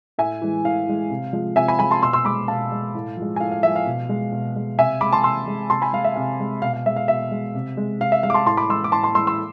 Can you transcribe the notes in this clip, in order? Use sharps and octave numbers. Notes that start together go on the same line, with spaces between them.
A2 E5 G#5
E3 G#3
A2 F5
E3 G#3
C3
F3 G#3
C3 E5 G#5
G#5 B5
F3 G#3 G#5 B5
A5 C6
B2 C6 E6
C6 E6
G#3 B5 D6
B2 F5 A5
G#3
A2
F3 G#3
G#5
A2 F5
F5
F3 G#3 E5
F5
B2
G#3
B2
G#3
C3 E5 G#5
G#3 B5 D6
A5 C6
C3 C6 E6
G#3
C3 A5 C6
G#5 B5
G#3 F5
E5
C3 F5
G#3
B2 F5
F5
G#3 E5
F5
B2 E5
G#3
C3
G#3
C3 F5
E5
G#3 F5
D6
A5 C6
A2 A5 C6
B5 D6
E3 G#3 C6 E6
D6
A2 A5 C6
A5 C6
E3 G#3 C6 E6
C6 E6